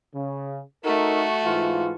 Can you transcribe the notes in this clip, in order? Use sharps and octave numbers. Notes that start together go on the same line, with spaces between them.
C#3
A3 D#4 F#4 A4 A#4
G#2 E3 F4